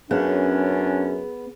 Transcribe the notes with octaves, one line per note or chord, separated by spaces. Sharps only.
F#2 B3 C#4 D4 G#4